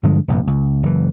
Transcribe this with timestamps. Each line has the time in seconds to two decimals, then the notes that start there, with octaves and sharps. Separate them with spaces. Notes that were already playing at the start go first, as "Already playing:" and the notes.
0.03 G2 D3 F3 G#3
0.28 F1 A#1 G2
0.47 C#2
0.83 F#1 E3